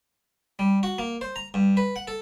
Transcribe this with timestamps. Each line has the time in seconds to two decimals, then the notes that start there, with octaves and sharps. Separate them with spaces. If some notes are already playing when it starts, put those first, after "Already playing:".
0.59 G3
0.83 F#4
0.98 A#3
1.21 C5
1.36 A#5
1.54 G2
1.77 B4
1.96 F#5
2.07 A4